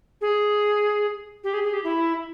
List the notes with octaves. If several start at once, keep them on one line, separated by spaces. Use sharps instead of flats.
G#4
G4
G#4
G#4
G4
E4